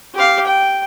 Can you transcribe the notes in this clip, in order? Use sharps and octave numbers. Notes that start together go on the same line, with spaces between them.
G4 F5
G5